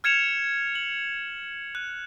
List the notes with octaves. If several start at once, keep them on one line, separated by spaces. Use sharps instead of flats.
F6 G#6 C#7 E7 F7
F#7
F#6